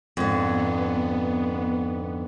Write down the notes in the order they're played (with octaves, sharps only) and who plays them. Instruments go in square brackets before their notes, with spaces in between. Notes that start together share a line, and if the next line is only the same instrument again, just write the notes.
[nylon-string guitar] F2 G#2 D3 [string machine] B3